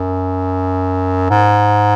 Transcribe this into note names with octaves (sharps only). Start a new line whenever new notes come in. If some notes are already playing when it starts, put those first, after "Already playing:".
Already playing: F#2
G#2